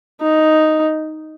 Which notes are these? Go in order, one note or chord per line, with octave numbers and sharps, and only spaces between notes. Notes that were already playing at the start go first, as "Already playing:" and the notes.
D#4